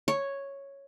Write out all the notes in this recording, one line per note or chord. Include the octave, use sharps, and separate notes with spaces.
C#5